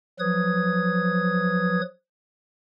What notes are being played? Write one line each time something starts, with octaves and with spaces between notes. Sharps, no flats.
F3 F#3 B4 D#6 G#6